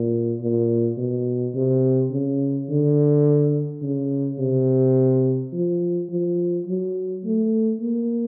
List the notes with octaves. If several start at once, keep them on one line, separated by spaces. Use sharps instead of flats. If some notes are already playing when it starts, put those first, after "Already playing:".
Already playing: A#2
A#2
B2
C3
C#3
D3
C#3
C3
F3
F3
F#3
A3
A#3